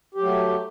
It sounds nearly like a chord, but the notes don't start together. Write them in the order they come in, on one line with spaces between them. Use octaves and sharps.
G4 F#3 A3